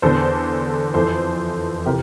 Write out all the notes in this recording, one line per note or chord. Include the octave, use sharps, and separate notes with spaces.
E2 D3 A4 C5
F2 E3 A4 C5
C3 E3 G4 A#4